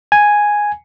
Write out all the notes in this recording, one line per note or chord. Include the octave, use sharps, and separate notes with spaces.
G#5